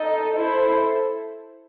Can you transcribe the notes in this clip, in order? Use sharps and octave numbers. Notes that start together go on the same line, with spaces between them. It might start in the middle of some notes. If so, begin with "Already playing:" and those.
Already playing: D#4 A4 D#5
E4 A4 C5